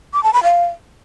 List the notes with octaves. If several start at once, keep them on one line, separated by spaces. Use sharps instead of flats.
D6
A5
B5
F5